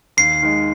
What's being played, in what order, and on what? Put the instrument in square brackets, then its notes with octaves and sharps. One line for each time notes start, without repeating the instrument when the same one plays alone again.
[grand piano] D#2 [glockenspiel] C7
[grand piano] D#3 G#3